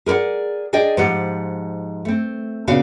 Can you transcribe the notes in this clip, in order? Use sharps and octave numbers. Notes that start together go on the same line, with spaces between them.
G#4 A#4 B4 D5 F#5
D4 G#4 D5 D#5 G5
G#2 F3 G4 F#5
A3 C4
A#2 C#3 B3 D4 F#4 F5